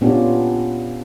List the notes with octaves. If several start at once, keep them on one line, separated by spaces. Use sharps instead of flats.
A#2 B3 C#4 D4 F4 G4